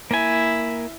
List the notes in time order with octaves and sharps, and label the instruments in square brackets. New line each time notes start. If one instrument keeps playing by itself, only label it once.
[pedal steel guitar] A#3 G#5 [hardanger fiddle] E4